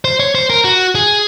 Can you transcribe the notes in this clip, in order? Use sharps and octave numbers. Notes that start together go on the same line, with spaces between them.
C5
C#5
C5
A#4
F#4
G#4